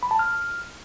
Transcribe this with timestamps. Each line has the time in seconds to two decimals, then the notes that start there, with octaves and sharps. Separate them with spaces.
0.03 B5
0.11 A5
0.19 F6